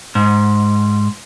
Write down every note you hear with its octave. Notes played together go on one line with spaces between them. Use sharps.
G#2